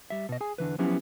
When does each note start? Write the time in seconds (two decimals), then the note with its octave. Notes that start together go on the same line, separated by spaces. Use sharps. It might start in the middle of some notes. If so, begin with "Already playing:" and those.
0.10 G3 E5
0.29 B2 D#5
0.41 G#4 G#5
0.58 E2 D3 E3 B4
0.78 F3 F#3 B3 C#4 E4 G4